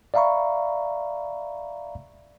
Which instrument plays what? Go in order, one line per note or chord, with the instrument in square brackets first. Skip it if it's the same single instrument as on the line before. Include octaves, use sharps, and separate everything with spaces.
[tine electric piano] D5 E5 F5 A#5 B5 C#6